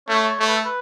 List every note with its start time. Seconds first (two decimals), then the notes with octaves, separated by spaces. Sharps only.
0.08 A3 C#5
0.40 A3 C#5
0.48 B4
0.56 A4
0.65 B4